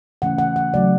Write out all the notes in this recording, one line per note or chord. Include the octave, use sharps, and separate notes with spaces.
C#3 E3 A3 C#4 F#5
F#5
F#5
C#3 F#3 A3 D5